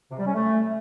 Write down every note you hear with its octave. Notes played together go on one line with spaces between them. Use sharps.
C3
G3
C#4
A3